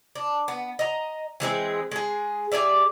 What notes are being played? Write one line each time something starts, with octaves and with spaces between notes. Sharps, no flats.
D4
B3
D#5 A#5
E3 G#3 C4 G#4
G#3 G#4
G4 G#4 D5 E5